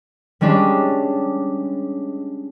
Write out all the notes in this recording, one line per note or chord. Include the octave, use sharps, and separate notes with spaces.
G3 G#3 C#4 D4